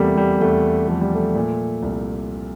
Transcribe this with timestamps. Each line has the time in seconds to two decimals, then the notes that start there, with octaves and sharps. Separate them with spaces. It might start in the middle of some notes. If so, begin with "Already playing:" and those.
Already playing: E2 C3 G3 A3 A#3
0.17 G3
0.40 E2 A3
0.88 F3 A3
1.01 G3
1.15 A3
1.35 A#2
1.83 C2